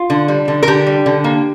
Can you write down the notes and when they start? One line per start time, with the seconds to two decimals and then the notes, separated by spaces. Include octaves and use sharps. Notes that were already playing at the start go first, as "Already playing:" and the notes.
Already playing: F4
0.10 D3
0.28 G3
0.48 D3
0.63 A#4
0.68 D3 G4
0.87 G3
1.06 D3
1.24 A#3